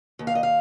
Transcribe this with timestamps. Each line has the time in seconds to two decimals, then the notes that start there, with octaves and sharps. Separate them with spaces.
0.19 D#2
0.27 F5
0.35 D#5
0.43 F5